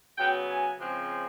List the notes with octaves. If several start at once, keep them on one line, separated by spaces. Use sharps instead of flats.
C#3 F#3 B3 G5
G#5
C#3 F3 G#3 C4